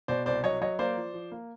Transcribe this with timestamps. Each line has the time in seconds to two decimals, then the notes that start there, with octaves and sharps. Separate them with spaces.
0.08 B2 C5 D5
0.26 C2 C5 D5
0.44 F#3 C#5 D#5
0.61 F#3 C#5 D#5
0.79 A#3 C5 D5
0.96 F3
1.14 F3
1.32 A#3